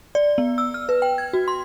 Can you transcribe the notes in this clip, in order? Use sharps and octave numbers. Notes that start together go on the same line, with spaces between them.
D5
B3
E6
F6
B4
G5
G#6
F#4
C6